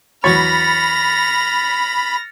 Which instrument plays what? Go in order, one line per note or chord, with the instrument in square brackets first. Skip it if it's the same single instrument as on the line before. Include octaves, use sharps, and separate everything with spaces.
[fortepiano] E2 F#3 C#5 [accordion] B5 [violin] F6 A#6 [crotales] A6 C#7